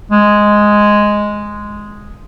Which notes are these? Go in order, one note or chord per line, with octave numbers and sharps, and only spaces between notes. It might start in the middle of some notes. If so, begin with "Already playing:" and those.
G#3